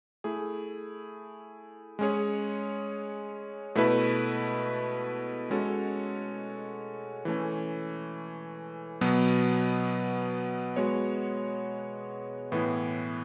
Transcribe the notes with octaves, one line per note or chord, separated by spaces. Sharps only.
A3 E4 G#4
G#3 C#4 G#4 C#5
B2 A3 E4 B4
G#3 C#4 F#4 A4 C#5
E3 A3 C#4
B2 F#3 B3
G#3 B3 F#4 C#5
A2 E3 B3 E4